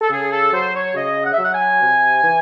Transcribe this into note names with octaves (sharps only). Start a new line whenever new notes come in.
A4
C#3 G#4
A4
F#3 C5
C#5
C#3 D#5
F#5
E5
F#3 F#5
G#5
C3
E3